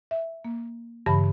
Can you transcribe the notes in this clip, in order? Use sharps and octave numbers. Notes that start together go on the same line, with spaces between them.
E5
A#3
G2 C#3 E3 A5 B5